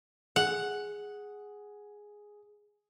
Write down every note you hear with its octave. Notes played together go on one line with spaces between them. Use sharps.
G#4 F#5